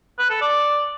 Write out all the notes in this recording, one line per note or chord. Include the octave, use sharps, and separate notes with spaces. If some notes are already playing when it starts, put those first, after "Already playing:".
B4
A4
D5